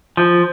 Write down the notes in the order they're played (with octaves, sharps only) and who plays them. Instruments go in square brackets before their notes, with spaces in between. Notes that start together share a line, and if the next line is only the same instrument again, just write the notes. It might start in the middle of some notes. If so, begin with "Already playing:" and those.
[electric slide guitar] F3